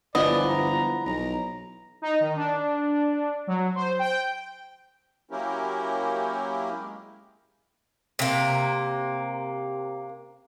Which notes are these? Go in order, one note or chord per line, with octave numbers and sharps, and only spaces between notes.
G1 E3 F3 G#3 B3 D5 D#5
A#5
B1 A#5
D#4
D#3
D4
F#3
C5
G5
F#3 A#3 C#4 E4 G4 A#4
G#3
C3 A#3